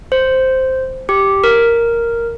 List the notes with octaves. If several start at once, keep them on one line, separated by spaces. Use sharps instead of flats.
C5
G4
A#4